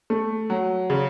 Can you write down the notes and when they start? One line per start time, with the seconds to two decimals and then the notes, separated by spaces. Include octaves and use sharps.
0.10 A3
0.50 F#3
0.90 C#3